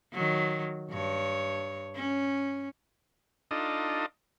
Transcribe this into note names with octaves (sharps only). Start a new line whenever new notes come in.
D#3 F#3
G2 C#5
C#4
D4 D#4 F4 A4 D#5